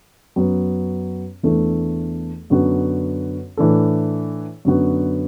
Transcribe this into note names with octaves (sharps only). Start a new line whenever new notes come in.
F#2 F#3 B3
E2 E3 A3 D4 A4
F#2 D3 B3 F#4
A2 E3 D4 A4
F#2 D3 B3 F#4